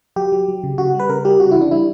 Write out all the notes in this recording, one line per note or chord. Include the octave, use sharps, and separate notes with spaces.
F#3 G4
F#3
F#3
C#3
C#3 F#4
G3
B4
C#3 A#4
G3 G4
C#3 F#4
E3 E4
D4
G3 E4